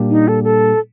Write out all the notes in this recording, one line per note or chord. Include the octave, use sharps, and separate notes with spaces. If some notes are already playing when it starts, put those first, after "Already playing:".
Already playing: A#2 G3 A#3 D4 G4
D#4
A4
A4